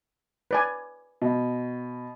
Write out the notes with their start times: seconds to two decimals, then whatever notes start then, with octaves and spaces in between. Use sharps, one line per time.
0.51 B4 D5 G#5
1.22 B2